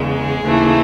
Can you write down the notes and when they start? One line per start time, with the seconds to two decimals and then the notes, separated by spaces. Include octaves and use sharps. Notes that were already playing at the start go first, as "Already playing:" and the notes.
Already playing: E2 C#3 G#3
0.14 G#4
0.45 D#2 C#3 E3 A3